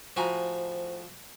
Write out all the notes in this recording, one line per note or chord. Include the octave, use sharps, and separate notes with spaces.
A2 F3 F#4 C5 G#5 A#5 C#6